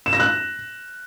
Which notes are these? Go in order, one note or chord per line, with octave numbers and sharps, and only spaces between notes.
E7
A#6
F#6